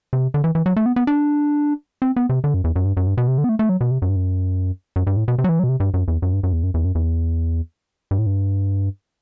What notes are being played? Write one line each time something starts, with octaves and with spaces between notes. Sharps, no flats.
C3
D3
E3
E3
F#3
A3
B3
B3
D4
C4
B3
C3
D3
F#2
E2
F#2
G2
F#2
G2
B2
C3
D3
B3
A3
A3
F#3
B2
C3
F#2
G2
F#2
F#2
G2
A2
B2
C3
F#3
E3
F#3
B2
C3
G2
F#2
E2
F#2
G2
F#2
E2
F#2
E2
F#2
E2
G2
A2
G2